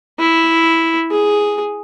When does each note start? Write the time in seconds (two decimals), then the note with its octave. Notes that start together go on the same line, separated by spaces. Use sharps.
0.19 E4
1.11 G#4